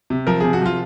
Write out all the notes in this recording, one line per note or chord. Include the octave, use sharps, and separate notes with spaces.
C3
F3 A#4
C3 G#4
F#4
F3 F4